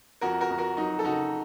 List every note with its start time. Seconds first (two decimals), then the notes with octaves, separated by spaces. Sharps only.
0.21 F2 F#4 A#4
0.41 F#4 A#4
0.50 F2
0.58 F#4 A#4
0.77 F#3 D#4 F#4
0.99 A4
1.05 C#3 D#4 F#4